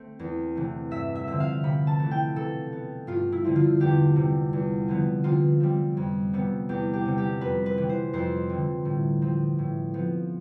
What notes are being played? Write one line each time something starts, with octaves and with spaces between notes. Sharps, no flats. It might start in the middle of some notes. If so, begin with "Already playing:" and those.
Already playing: A3 C4
E2
C3 E3 A3
G2 E5
E5
D3 F3 C4 E5
F5
C3 B5
A5
E3 A3
G5
B2 A4
B3
G2 F4
E4
D3 F3 C4
F4
E2 G4
C3 G3
E2
D3 F3 B3
C3 F4
G3 C4
F2
C3 G3 B3
E2 G4
G4
C3 G3
G4
F2 B4
B4
C3 E3 G3
C5
F2 C5
D3 G3
A2
F3 C4
A2
F3 B3